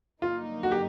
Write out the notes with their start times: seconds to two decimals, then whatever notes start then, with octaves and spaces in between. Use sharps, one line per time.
0.22 G2 D3 F#3 A#3 D#4 F4
0.63 F#4
0.72 G4